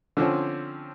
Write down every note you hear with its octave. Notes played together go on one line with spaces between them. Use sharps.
D3 F3 C4 C#4